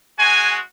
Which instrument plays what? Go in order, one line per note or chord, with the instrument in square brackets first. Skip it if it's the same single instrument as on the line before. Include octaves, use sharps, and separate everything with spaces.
[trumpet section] G#3 F#4 G#5